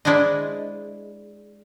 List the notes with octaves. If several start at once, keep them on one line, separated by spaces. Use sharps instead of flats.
G#3 D4 E4 C5 D#5